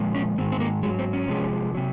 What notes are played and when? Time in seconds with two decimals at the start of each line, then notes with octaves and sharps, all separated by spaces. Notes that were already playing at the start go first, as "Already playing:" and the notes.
Already playing: A#2 F3 G#3
0.15 C#4
0.38 G#2 D#3 G#3 C4
0.52 C4
0.60 A#3
0.83 G#2 F#3 G#3
0.99 C4
1.13 C#4
1.28 C3 F3 G#3
1.75 C3 F#3